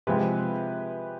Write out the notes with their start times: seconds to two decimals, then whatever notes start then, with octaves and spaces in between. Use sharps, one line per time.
0.07 C3 F3 G#3 C4 F4 G4 B4